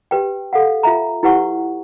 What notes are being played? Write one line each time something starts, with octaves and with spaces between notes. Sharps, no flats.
G4 B4 G5
A4 F5 F#5
F4 E5 A#5
E4 G4 B4 F#5 C#6